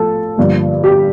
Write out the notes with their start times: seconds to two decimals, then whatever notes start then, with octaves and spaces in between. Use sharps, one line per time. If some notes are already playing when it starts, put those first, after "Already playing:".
Already playing: F3 A3 A4
0.37 G2 D3 F3 A#3
0.84 G4